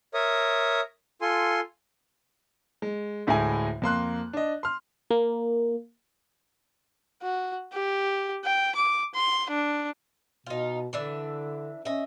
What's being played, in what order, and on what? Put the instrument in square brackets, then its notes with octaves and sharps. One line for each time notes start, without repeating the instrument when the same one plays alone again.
[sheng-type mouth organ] A#4 C#5 E5 D#6
F4 A4 G#5 C6
[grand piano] G#3
D2 A2 G#3 E4 G#5
F2 A#3 C6 F#6
D4 D#5
C6 F6
[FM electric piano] A#3
[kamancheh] F#4
G4
G5
D6
C6
D4
[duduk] B2 [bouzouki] D#4 F4
[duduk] D3 [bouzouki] E3 D4 E5
[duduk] C#4 [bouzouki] D#5 E5